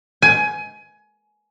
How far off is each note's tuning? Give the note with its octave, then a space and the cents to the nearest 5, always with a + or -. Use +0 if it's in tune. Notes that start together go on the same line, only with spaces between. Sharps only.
G#5 +20